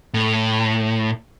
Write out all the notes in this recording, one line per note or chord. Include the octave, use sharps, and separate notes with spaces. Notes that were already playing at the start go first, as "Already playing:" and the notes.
A2